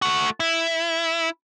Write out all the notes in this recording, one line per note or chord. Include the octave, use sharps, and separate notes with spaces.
A3 F#4
E4